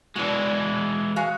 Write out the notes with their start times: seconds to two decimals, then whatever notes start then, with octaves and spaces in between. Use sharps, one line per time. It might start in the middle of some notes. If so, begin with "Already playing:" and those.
0.16 E3 G#3 D4 F#4
1.16 G#3 F#4 F5